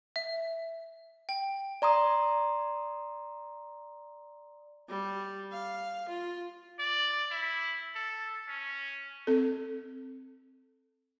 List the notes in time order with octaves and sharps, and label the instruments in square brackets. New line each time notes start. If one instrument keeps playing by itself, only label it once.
[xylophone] E5
G5
[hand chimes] D5 A#5 C6 D#6
[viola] G3
F5
F4
[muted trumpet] D5
E4
A4
C#4
[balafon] C4 A4